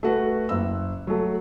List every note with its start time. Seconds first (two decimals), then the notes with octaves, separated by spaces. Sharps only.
0.03 A3 F#4 B4
0.49 F#1 E6
1.07 F#3 A3